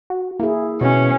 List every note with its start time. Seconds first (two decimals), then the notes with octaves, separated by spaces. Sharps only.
0.10 F#4
0.40 A#3 E4 G#4
0.81 B2 C#4